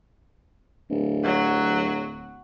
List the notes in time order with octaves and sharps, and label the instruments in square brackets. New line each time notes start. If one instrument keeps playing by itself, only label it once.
[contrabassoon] D1
[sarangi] F#3